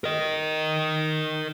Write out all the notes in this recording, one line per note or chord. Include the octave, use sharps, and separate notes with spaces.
A#4 D#5